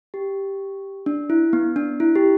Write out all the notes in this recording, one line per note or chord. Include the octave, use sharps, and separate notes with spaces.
G4
D4
E4
B3
D4
E4
G4